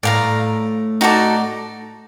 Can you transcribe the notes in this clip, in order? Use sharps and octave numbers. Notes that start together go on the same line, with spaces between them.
A2 D5 F5 A#5
D#4 F#4 A4 D5